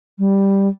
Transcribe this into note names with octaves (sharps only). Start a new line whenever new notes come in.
G3